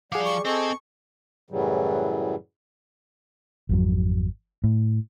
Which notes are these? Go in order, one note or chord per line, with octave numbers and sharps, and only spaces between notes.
F3 G3 G#4 F5 F#5 D6
C#6
C4 A4 D#5 G#5 C#6
F#2 A2 C#3 E3 F#3 G3
G#1 F2 F#3
A2